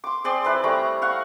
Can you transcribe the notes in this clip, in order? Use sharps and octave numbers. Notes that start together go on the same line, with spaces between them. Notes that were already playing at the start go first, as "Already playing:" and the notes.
C6 D6
C4 G#4 D5 C6
E4 B4 D5 E5
G3 A3 A#5 C#6
F5 F#5 C#6